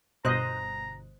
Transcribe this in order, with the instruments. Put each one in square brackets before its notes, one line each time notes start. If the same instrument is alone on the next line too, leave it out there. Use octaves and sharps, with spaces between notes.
[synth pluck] G1 B2 F#6 [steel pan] C5 D#5 [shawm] A#5